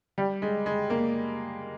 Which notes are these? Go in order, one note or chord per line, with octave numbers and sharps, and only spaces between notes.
G3
G#3
G#3
A#3